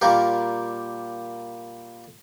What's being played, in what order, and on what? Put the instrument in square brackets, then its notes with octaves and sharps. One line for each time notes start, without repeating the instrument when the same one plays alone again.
[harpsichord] A#2 G3 A#3 G4 A#4